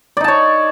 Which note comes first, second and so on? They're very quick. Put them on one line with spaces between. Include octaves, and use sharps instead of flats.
D5 D#4 A5 C#5